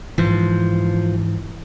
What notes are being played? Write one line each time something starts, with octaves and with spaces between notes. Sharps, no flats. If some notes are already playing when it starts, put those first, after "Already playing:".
G#2 E3 F3